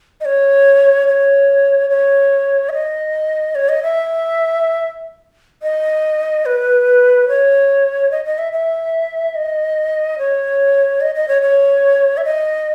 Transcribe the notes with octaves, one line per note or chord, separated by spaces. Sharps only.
D#5
C#5
C#5
C#5
E5
D#5
C#5
D#5
E5
D#5
B4
C#5
D#5
D#5
E5
E5
D#5
C#5
D#5
D#5
C#5
C#5
E5
D#5